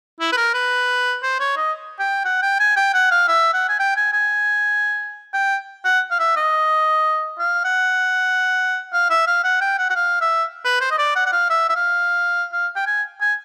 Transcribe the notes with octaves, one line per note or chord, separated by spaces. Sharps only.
E4
B4
A#4
B4
C5
C#5
D#5
G5
F#5
G5
G#5
G5
F#5
F5
E5
F#5
G#5
G5
G#5
G#5
G5
F#5
F5
E5
D#5
F5
F#5
F5
E5
F5
F#5
G5
F#5
F#5
F5
E5
B4
C5
D#5
D5
F#5
F#5
F5
E5
E5
F5
F5
G5
G#5
G#5